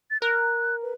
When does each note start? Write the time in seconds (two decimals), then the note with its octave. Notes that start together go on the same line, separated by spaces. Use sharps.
0.11 A6
0.22 A#4 F#6
0.83 B4